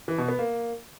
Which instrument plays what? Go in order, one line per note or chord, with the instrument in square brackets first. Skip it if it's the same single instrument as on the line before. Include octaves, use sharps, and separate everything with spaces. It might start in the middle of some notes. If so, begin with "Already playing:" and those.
[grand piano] E3
B2
B3
A#3